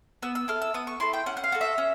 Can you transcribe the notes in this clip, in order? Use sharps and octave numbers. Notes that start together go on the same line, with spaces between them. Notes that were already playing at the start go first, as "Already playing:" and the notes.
B3 E6
E6
E4 A4 F6
E6
B3 D#6
C#6
E4 A4 C6
G5
C#4 F#5
F#5
F5
F#4 A4
E5
C#4